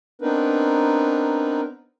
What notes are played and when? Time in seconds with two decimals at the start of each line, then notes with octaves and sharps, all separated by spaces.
0.22 B3 C4 D4 D#4 A#4 B4